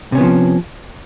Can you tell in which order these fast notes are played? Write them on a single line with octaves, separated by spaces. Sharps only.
C3 C#4 B3 E3 F3